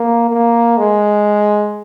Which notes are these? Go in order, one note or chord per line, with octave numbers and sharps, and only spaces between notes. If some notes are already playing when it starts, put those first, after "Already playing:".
Already playing: A#3
A#3
G#3